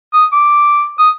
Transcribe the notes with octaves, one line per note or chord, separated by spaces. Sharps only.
D#6
D6
D#6